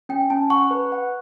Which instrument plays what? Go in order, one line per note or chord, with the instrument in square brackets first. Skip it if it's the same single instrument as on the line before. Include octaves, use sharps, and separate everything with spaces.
[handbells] C#4 [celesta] G5
[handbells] C#4 [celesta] A5
[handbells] F#5 [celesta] C#6
[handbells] B4
F#5